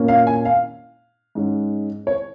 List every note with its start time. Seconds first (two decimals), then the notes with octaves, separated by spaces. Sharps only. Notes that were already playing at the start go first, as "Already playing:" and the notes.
Already playing: A#2 A#3 C#4
0.08 F5
0.27 G#5
0.45 F5
1.35 G#2 G#3 C#4
2.07 C#5